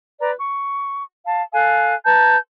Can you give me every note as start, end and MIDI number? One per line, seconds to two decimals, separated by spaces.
0.19 0.31 71
0.19 0.31 74
0.19 0.31 82
0.39 1.04 85
1.25 1.43 77
1.25 1.43 81
1.54 1.94 69
1.54 1.94 77
1.54 1.94 80
1.54 1.94 90
2.05 2.36 71
2.05 2.36 81
2.05 2.36 82
2.05 2.36 91